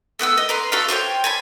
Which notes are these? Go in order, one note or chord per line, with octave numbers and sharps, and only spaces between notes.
A3 B3 F#5 E6
D#5
B4 A#5 C6
F#4 A4 E5 F5
C5 C#5 F5 G5
G#5 A5 B5